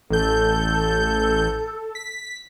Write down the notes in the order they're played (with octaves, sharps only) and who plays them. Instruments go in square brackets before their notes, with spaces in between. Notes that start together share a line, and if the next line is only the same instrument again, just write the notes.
[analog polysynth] A1 G6 [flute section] A4
[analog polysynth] B6